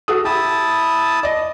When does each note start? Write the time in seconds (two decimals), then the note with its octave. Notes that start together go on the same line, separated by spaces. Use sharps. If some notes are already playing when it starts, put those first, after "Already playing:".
0.08 F#4 A4 D#6
0.25 E4 G4 A5 D#6
1.23 D5 D#5